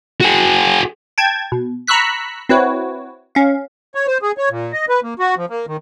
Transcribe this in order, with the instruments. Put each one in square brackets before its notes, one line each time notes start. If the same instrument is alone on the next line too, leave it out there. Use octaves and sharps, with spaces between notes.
[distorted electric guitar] F#4 G#4
[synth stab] G5 A5 G#6
B2
A#5 B5 C#6 E6 F#6 B6
C4 E4 F#4 B4 C#5
C#4 F5
[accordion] C#5
C5
G#4
C#5
A#2
D#5
B4
A#3
F#4
F3
A#3
D#3